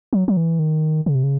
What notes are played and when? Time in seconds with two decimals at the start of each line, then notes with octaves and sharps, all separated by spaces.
0.13 F#3
0.28 F#3
0.37 E3
0.59 D#3
1.06 C#3
1.15 C3
1.23 C#3